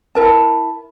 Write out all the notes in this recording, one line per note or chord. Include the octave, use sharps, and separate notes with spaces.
E4 A#4 A5